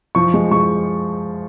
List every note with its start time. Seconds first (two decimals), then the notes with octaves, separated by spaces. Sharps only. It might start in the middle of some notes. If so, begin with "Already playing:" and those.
0.15 F3 C#6
0.34 G#3
0.51 G#3 C#6